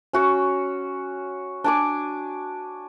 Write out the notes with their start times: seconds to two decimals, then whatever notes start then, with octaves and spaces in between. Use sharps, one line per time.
0.13 C#4 F#4 C#5
1.64 D4 G#5 D6